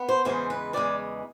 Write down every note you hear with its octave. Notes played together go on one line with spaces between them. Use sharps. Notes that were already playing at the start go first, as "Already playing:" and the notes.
Already playing: B3
C5
E2 C#3 E3 G#3 C5
B4
E2 C#3 E3 G#3 D5